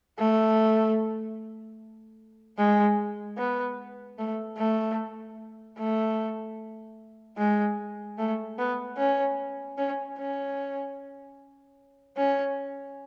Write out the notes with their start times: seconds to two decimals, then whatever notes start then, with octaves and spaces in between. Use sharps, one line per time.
0.19 A3
2.58 G#3
3.38 B3
4.19 A3
4.58 A3
5.79 A3
7.38 G#3
8.18 A3
8.59 B3
8.98 C#4
9.78 C#4
10.18 C#4
12.18 C#4